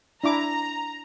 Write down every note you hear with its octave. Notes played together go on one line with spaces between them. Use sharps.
D4 E4 A#5 D6